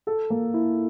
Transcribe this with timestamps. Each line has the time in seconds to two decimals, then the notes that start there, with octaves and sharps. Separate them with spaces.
0.07 A4
0.30 A#3
0.54 E4